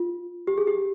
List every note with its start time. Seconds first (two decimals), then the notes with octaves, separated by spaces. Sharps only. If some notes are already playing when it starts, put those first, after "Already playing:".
Already playing: F4
0.47 G4
0.58 G#4
0.67 G4